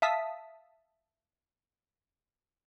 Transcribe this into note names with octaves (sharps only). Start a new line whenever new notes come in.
E5 F5 A5 D#6 B6